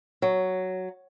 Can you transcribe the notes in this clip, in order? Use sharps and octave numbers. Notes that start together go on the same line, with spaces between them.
F#3